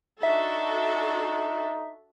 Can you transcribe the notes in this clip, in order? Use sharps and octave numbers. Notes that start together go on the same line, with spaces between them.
D4 D#4 F#4 A4 E5